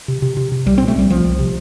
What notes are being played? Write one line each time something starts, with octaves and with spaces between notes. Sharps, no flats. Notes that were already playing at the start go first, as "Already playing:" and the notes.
C3
C3
C3
C3
C2 G3
A#2 C4
A3
C2 G3
C2 F3
C2
C3